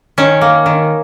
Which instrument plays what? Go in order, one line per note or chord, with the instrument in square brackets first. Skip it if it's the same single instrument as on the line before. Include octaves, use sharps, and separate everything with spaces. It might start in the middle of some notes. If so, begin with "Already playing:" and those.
[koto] D#3 C#4
A#3
D#3